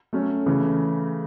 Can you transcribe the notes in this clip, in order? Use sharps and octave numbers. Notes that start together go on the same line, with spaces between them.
F#3 A3 C#4
C#3 E3 A3